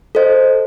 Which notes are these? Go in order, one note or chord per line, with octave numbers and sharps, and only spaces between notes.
A4 C5 D#5